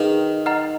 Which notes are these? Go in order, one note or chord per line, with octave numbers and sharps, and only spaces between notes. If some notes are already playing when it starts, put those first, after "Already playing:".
Already playing: D#3 G#4 B4 F5
D#5 F#5 A#5 F6